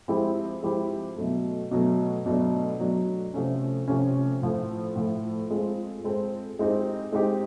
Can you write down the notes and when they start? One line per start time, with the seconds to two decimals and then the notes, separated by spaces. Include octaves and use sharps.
0.08 F3 G#3 C4 E4 G4
0.63 F3 G#3 C4 E4 G4
1.17 B2 F#3 A3
1.71 B2 F#3 A3
2.26 B2 F#3 A3 D4
2.79 B2 F#3 A3 D4
3.34 C3 F3 A3 C#4
3.88 C3 F3 A3 C#4
4.42 A2 F3 A3
4.96 A2 F3 A3
5.50 G#3 C4 F4 A4
6.04 G#3 C4 F4 A4
6.59 G#3 C4 D#4 G4
7.12 G#3 C4 D#4 G4